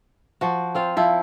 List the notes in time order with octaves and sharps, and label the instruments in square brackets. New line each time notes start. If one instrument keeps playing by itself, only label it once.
[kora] F3 F#4
C4 F4 F5
[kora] F3 E4 [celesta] F5